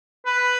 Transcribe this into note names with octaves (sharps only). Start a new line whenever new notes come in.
B4